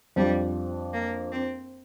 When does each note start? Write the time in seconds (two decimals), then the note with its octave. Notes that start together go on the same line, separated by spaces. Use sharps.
0.16 F2 F3 G3 D4
0.93 A#3
1.32 C4